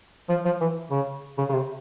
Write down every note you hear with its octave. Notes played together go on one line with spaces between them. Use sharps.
F3
F3
E3
C#3
C#3
C#3
C3